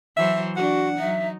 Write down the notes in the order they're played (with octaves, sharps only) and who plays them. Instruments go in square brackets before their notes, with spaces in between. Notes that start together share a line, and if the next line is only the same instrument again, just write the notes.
[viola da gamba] E3 F#3 C5 [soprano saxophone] E5
[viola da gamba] D4 [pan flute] F#4 [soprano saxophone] F#5
[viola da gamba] F#3 D#4 [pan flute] E5